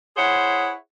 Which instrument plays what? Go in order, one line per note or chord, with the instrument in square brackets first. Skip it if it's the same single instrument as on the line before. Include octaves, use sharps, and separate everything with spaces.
[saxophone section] E4 G#4 C5 C#5 F#5